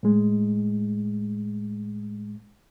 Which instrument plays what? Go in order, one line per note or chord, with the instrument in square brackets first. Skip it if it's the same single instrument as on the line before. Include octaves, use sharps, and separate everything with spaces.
[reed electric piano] A2 G#3